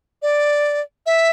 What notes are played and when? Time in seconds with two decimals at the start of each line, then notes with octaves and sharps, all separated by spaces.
0.22 D5
1.06 E5